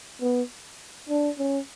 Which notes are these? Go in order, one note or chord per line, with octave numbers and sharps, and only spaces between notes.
B3
D4
C#4